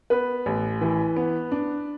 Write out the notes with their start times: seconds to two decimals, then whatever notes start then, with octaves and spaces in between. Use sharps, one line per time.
0.10 B3 B4
0.46 A1
0.81 E3
1.16 B3
1.52 D4